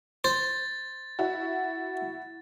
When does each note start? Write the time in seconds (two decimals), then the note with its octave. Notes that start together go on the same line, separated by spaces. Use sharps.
0.24 C5 A6
1.19 E4 F#4